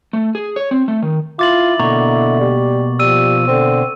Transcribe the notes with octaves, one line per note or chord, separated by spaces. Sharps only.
A3
G#4
C#5
C4
A3
D#3
E4 F4 D6 A6 F#7
B2 D3 A#3 A#5 C#6
G3
F3 G3 E6 D#7
D3 C4